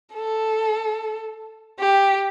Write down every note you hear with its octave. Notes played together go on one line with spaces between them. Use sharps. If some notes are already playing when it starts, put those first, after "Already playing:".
A4
G4